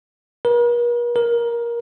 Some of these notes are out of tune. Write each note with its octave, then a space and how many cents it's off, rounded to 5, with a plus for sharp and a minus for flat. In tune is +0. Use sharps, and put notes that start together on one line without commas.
A#4 +45
A#4 +15